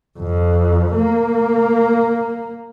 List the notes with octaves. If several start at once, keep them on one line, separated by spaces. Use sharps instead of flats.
F2
A#3